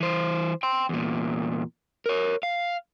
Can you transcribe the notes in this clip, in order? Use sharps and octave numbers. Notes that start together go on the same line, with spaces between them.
E3 C5
G5 C6
E2 A#2
A#4 C#5
F5